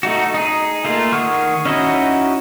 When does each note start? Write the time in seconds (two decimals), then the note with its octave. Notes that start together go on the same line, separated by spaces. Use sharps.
0.03 A3 D#4 F#4
0.34 D#4 G#4
0.85 A3 A#3 F4
1.12 D#3 G#4 F#5 C#6 F6
1.65 C#4 D#4 E4 F#4 D#5